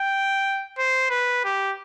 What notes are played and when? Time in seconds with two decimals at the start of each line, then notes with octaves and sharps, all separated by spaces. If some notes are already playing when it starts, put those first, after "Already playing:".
Already playing: G5
0.78 C5
1.10 B4
1.45 G4